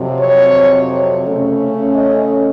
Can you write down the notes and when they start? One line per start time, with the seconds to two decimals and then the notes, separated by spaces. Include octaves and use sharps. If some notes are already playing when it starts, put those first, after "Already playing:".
Already playing: F2 C3 F#3
0.19 C#5
1.24 C#3 A3 C#4
1.94 D#5